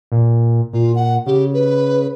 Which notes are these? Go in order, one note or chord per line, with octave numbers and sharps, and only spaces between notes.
A#2
A#2 F4
F#5
C#3 G4
B4